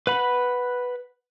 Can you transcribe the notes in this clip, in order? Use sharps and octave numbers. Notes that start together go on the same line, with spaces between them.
B4 F#5 B5